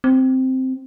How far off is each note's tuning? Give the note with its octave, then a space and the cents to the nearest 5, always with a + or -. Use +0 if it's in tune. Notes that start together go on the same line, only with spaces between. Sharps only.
C4 -5